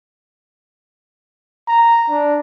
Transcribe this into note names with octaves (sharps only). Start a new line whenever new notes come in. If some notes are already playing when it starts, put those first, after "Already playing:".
A#5
D4